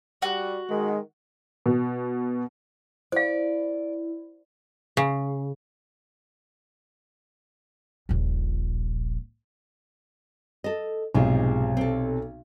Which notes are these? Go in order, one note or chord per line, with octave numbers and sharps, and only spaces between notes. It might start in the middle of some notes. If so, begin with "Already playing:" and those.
G3 F#4
D#3 G#3
B2
E4 C5 D5 F5
C#3
D#1 A#1
A4 D#5
B1 G#2 C3 F3 G#4
C4 A4